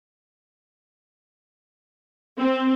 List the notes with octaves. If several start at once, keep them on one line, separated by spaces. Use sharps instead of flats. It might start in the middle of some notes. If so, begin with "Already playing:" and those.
C4